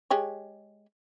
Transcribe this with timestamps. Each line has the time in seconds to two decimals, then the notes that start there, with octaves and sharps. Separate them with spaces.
0.11 G#3 G4 C#5